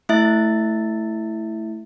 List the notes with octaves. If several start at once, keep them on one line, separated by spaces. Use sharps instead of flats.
A3 E4 E5 A6